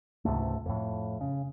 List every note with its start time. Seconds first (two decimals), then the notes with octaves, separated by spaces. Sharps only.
0.25 C#2 G#2 C3 A3
0.66 F2 A2
1.21 C#3